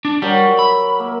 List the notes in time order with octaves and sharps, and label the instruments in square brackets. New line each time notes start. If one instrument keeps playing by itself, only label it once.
[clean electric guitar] D4
[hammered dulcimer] F#3 A#4 [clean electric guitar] G3
[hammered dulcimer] E5 [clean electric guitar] B5
[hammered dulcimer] A#3